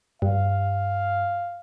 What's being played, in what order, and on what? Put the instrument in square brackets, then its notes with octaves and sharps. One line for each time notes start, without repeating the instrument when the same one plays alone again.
[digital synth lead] G2 [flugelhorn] F5